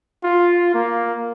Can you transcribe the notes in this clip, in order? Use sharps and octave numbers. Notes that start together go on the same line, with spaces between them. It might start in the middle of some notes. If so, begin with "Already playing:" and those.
F4
A#3